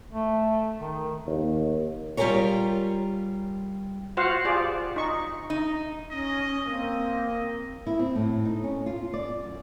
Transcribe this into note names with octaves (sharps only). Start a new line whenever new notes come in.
A3
D#3
D#2
G3 F4 G4 G#4 A#4 C#5
F4 F#4 C5 F5 F#5
F4 G4 G#4 C5 D5
D#4 C#6
D#4
C#4 D#5
A#3 C4 D#5
E4
C4
A2
D#4
C#4
F4
D5
F#2